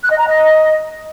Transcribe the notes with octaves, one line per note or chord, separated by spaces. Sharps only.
F#6
D#5
A#5
D#5